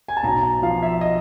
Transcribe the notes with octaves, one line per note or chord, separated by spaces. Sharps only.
G#5
A5
B1 A#5
A5
F3 F5
E5
D#5